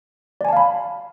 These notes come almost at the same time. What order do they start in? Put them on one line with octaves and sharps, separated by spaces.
D5 G#5 A5 F5 B5